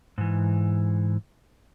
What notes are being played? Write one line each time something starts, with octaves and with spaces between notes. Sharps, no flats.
G#2 E3